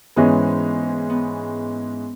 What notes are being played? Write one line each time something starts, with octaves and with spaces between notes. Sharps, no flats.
G#2 E3 G#3 B3 C#4
B3